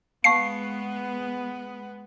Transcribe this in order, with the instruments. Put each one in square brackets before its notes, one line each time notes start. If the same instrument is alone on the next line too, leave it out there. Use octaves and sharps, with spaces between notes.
[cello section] G#3 B3 [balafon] F5 A5 C#6 [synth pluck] C7